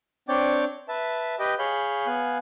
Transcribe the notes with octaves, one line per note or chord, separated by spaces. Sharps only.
C4 D4 C#5 D5 G5 D6
B4 E5 A5
G4 B4 D#5 G5
G#4 C#5 F5 B5 G6
B3 F5 G#5 F#6